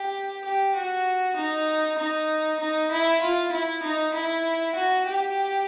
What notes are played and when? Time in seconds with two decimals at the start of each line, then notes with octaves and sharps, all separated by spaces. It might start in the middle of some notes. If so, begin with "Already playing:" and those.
Already playing: G4
0.44 G4
0.75 F#4
1.36 D#4
1.98 D#4
2.59 D#4
2.91 E4
3.22 F4
3.52 E4
3.83 D#4
4.14 E4
4.75 F#4
5.06 G4